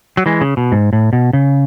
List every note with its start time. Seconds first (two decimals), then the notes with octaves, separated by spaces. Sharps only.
0.17 F#3
0.26 E3 G#3
0.41 C#3
0.57 B2
0.72 G#2
0.93 A2
1.13 B2
1.33 C#3